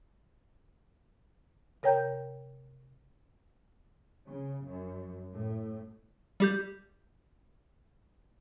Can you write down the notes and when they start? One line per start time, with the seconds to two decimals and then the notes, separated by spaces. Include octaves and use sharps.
1.83 C3 A#4 C#5 G5 A#5 G6
4.28 C#3
4.65 F#2
5.34 A2
6.40 G3 G4 G6